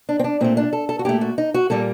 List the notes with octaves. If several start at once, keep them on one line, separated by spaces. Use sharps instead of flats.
D4
C4
D4
A#2 A3 C4
D4
A4
A4
F#4
A#2 A3 G4
F#4
D#4
F#4
A#2 G3 A#3 A4